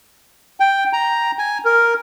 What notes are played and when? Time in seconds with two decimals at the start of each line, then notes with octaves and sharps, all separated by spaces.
0.60 G5
0.93 A#5
1.39 G#5
1.65 A#4